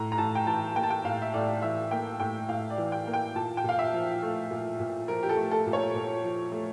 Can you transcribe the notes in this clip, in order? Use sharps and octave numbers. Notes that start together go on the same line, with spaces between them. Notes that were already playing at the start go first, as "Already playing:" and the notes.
Already playing: A2 A#5
A#5
A2 A5
G5
E3 A5
A#3 G5
A5
G5
A2 F5
E5
A2 D5
E3 E5
A#3 G5
A2 G5
A2 F5
D5
E3
G5
A#3
G5
A#2 A5
G5
A#2 F5
E5
F3
A3
A#2
A#2
F3 A#4
G4
A4
A3
A4
A#2
C#5
A#2
F3
A3